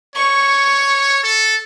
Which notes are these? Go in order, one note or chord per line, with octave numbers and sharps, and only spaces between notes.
C#5 C#6
A4